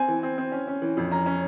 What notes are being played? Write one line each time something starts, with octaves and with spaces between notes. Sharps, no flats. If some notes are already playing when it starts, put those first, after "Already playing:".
Already playing: C4 G#5
E3
C4
C4
C#4
C#4
E3
F2
C#4 A#5
C#4